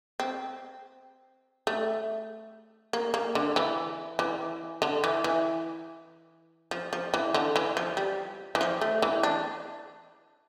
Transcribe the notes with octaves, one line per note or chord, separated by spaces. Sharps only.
C4
A3
A#3
A#3
D3
E3
E3
D3
E3
E3
F3
F3
E3
D3
E3
F3
G3
E3
F3
A3
E3
D4